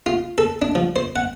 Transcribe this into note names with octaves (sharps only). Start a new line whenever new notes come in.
F4
A4
D4
F3
C5
F#5